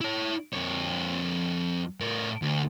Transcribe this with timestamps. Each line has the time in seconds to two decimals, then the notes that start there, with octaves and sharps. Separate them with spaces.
0.01 E4 C#5
0.53 F2 C#5
2.01 A2 A#4
2.42 D2